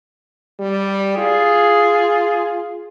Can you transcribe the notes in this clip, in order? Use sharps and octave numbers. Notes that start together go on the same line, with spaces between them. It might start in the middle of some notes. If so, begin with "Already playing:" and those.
G3
F4 G#4